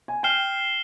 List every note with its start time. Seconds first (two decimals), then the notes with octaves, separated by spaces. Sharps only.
0.08 G#5
0.23 G5 F6 C7 E7 G7